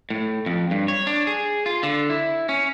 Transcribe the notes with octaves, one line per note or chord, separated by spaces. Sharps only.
A2
F2
G2
C#5
D4
G#4
F4
D3
E4
C#4